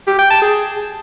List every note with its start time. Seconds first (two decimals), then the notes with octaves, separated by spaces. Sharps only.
0.07 G4
0.19 G5
0.30 A5
0.42 G#4